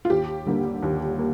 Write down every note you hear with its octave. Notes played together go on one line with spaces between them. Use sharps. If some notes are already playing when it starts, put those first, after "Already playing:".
F4
D#2 G4
D3 G3 A#3
D#2
A#3